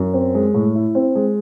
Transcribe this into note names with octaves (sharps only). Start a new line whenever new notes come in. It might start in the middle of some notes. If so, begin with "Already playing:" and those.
Already playing: F#2
C4
G#3
A2
E4
C4
G#3